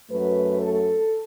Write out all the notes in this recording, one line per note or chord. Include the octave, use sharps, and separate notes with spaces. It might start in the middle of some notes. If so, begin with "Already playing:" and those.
F#2 F#3 A3 B4
A4